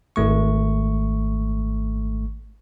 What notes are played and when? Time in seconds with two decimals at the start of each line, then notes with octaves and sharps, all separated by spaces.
0.16 G#1 A3 C#6